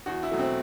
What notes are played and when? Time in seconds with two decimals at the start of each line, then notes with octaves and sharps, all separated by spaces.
0.06 E2 F#4
0.23 E4
0.31 B2 F#3 A3
0.39 C4